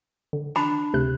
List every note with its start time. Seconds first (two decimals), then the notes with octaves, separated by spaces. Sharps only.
0.33 D3
0.56 D4 A5 B5
0.93 D2 C3 F#6